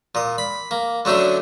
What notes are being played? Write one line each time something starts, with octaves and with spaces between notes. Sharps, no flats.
A#2 D#6
B5
A#3
D3 F#3 A3 C#4 D4